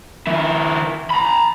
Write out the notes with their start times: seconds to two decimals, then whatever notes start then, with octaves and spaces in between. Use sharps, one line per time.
0.27 D#3 E4
1.10 A#5 B5